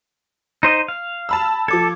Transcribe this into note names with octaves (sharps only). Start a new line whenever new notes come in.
D#4 C5 D#5
F5
A5 B5 E6
F3 A4 D6 G#6